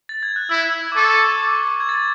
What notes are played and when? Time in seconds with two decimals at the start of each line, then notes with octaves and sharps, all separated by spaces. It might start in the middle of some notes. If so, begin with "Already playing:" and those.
0.09 A6
0.23 G#6
0.36 F#6
0.49 E4 E6
0.92 D6
0.96 A4 C#6
1.42 D6
1.80 G#6
1.89 A6